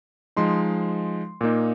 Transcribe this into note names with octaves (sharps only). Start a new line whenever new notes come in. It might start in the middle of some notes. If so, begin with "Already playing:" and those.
F3 G#3 D#4 C6
A#2 A#3 D#4